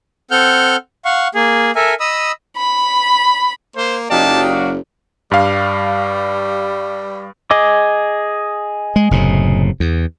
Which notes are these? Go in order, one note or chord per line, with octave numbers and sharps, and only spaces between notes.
C4 A4 F#5 F6 G6
F5 F#5 C#6
A#3 G#4
A4 A#4 E5 G#5
D#5 B5 D#6 E6
B5
A#3 C5
F#1 F#3 D#4 G4 D5 D#5 F5 A5
F#4
G2 G3 F5
G#4 D#5 D6
G#3
F#1 A2 C3
E2